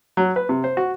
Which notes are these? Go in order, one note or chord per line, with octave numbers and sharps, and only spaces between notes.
F#3
B4
C3
C5
F#4